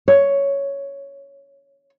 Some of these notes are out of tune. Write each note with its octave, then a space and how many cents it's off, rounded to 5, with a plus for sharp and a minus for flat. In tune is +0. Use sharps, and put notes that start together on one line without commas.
C#5 +5